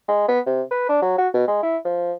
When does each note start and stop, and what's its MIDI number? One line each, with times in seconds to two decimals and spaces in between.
0.08 0.24 56
0.28 0.40 59
0.46 0.62 48
0.71 0.88 71
0.89 0.98 62
1.02 1.15 54
1.18 1.28 66
1.34 1.46 47
1.48 1.62 56
1.63 1.77 64
1.85 2.13 53